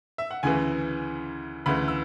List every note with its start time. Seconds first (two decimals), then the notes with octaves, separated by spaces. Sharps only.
0.18 E5
0.31 F#5
0.43 D2 C#3 E3 G#5
1.66 D2 C#3 E3 B5
1.88 E6